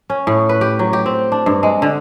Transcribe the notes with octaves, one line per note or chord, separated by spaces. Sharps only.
C#4
A2
B4
G4
F#3
G4
C4
D4
G2
G#3
D3